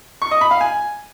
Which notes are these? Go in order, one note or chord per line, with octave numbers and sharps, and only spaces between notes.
C#6
D#5
B5
F5
G#5